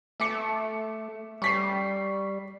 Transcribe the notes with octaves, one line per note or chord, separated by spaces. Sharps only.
A3 E5 D6 C#7
G3 C#6 B6 C7